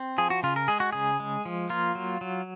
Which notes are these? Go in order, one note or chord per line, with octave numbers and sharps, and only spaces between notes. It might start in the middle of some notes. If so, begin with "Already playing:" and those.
Already playing: C4
F3 G#4
F#4
C#3 F4
A#4
G#3 G#4
F#4
C#3 G#4
G#3
F3
A#3 F4
F#3
F#3